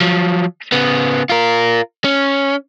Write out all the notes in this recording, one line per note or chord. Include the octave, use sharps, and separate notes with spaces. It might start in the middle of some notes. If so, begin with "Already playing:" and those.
F3 F#3
C#3 B3
F4 A#4
C#4